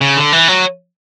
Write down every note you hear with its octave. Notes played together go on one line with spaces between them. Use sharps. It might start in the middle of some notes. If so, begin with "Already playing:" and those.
C#3
D3
E3
F#3